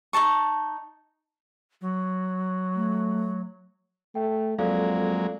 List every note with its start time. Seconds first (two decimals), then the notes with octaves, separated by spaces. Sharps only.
0.13 D#4 A4 A5 C#6
1.81 F#3
2.76 A3
4.15 A3 G5
4.59 F2 F#3 G#3 A#3 A4 D5 F5